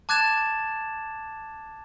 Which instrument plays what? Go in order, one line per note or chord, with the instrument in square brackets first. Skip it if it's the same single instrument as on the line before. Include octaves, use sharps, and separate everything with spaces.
[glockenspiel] A5 D6 F#6 G#6 A6 E7